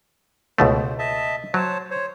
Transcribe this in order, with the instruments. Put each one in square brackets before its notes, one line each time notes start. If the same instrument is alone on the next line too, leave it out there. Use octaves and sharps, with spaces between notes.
[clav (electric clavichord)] C#2 B2 A3 [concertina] C5
[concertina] D#5 E5 A5
[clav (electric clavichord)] F#3 [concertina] C5 C#5 A5
[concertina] C5 C#5